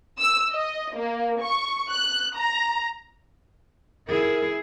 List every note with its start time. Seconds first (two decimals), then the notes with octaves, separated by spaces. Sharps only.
0.19 E6
0.53 D#5
0.95 A#3
1.41 C#6
1.91 F#6
2.37 A#5
4.08 E4 G#4 A#4